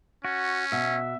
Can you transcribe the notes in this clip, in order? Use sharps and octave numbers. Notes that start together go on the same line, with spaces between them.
C#4 F#4
B2 E5